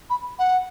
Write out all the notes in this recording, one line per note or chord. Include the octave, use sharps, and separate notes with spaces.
B5
F#5